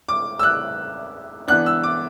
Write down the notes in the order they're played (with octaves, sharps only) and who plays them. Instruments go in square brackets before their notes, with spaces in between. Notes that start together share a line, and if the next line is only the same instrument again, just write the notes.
[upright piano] D6
E6
F#6
E3 B3 D4 F#6
E6
D6